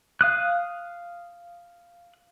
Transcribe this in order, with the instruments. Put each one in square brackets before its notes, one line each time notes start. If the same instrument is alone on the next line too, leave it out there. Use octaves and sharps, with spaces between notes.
[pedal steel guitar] F5 D#6 F#6